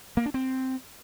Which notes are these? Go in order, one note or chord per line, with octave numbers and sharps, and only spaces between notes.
A#3
D4
C4